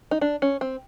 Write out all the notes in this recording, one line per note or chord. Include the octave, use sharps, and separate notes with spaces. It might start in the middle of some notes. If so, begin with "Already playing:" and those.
D#4
D4
C#4
C4